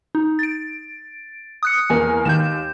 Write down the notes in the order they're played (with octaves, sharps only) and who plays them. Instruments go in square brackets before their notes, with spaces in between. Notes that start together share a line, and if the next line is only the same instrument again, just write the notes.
[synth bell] D#4
A6 D7
D#6 F#6 C#7
[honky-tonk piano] E2 A#3 [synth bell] G#5
[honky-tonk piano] D#2 [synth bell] G6 E7